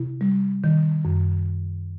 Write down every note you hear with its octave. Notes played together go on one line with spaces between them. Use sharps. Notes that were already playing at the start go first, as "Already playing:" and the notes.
Already playing: C3 E4
G3
D#3
F#2